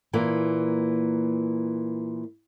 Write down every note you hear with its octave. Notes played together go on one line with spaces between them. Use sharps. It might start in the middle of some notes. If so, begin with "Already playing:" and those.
A#2 E3 A#3